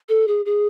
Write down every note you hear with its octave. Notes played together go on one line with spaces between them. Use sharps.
A4
G#4
G#4